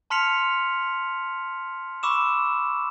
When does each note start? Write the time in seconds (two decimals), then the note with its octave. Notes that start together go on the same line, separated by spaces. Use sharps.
0.10 A5 C6 F6 B6 C#7 F7
2.03 B5 C#6 D6 E6 E7